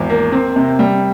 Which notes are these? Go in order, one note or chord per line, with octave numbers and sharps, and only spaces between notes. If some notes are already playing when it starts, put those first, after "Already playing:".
Already playing: G#1 E2
A#3
C4
C3
G3